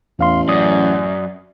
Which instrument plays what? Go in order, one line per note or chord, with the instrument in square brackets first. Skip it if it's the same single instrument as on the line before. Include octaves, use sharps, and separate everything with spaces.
[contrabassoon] A1 [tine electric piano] E2 F5 C6
[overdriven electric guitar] F#2 [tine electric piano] D5 D#6